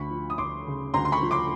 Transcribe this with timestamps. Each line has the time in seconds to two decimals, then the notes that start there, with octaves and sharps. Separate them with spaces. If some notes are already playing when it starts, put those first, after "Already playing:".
Already playing: D2 B5 C#6
0.10 F3
0.30 D#6
0.38 D2 C6 D6
0.67 C#3
0.94 D2 A#5 C6
1.05 C6
1.12 B5 C#6
1.22 F3
1.31 C6 D6